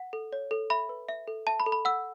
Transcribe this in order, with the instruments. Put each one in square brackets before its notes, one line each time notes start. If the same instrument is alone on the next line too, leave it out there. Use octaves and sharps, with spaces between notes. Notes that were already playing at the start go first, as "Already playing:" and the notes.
Already playing: [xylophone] F#5
A4
C#5
A4
E5 B5
B4
E5
A4
E5 A5
B5
A4
B5
F#5 E6